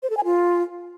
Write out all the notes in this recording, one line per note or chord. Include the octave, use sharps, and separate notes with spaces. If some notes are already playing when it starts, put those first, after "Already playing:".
C5
A4
G#5
F4